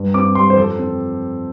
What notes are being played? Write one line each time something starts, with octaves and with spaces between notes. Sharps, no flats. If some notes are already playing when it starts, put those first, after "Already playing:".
Already playing: G2
C4 D6
G3 C6
C5
F2 A4
C4